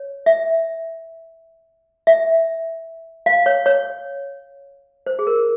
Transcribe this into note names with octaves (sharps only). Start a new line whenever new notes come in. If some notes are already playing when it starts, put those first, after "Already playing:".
Already playing: C#5
E5
E5
F5
C#5
C#5
C5
G#4
A#4